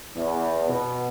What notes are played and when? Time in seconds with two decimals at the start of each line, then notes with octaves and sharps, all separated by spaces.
0.15 E2
0.68 B2